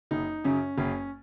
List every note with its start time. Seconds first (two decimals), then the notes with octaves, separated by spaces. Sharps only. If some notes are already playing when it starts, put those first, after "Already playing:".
0.11 F#1 D#4
0.44 F#2 C#3 C#4
0.78 F#1 C#4